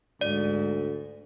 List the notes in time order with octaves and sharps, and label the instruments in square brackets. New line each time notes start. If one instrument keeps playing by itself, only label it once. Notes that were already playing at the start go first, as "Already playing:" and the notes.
[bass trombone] D2 [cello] G#2 [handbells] D5